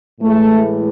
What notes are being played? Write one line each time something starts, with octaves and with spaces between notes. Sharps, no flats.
A2 E3 G#3 A3